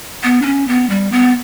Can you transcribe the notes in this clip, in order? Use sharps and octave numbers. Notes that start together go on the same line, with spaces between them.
B3
D4
C#4
B3
G3
B3